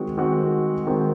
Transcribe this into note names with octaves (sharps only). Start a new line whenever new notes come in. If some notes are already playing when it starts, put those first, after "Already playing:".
Already playing: D#3 G#3 C4 F#4
D#3 G#3 C4 F#4
D#3 G#3 C4 F#4